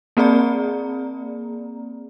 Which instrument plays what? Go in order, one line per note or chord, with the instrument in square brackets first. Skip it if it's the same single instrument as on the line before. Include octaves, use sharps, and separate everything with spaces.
[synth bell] A#3 C4 G#4 D5 A#5